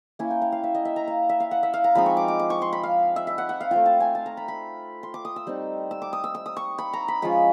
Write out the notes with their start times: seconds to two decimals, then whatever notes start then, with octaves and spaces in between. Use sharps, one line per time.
0.19 A#3 C#4 E4 G#5
0.31 G5
0.42 F5
0.52 F5
0.64 E5
0.75 D#5
0.85 E5
0.96 A#5
1.08 F5
1.29 E5
1.40 F5
1.51 F#5
1.63 E5
1.74 F5
1.84 A#5
1.95 F3 G#3 C4 D#4 B5
2.06 C#6
2.17 D6
2.28 D6
2.39 D6
2.50 C#6
2.62 C6
2.73 B5
2.83 F5
3.16 E5
3.27 E5
3.38 F#5
3.49 F#5
3.61 F5
3.71 A3 C4 F4 G5
3.86 A5
4.00 G#5
4.15 A5
4.26 A#5
4.37 B5
4.48 B5
5.03 C6
5.14 D6
5.25 D#6
5.36 E6
5.47 G3 C4 D#4
5.91 E6
6.02 D6
6.13 D#6
6.24 E6
6.35 E6
6.46 D#6
6.57 C#6
6.78 B5
6.93 A#5
7.08 B5
7.22 F3 G#3 C#4 F4 B5